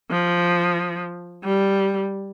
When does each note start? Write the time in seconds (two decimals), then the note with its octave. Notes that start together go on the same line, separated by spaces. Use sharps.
0.11 F3
1.44 G3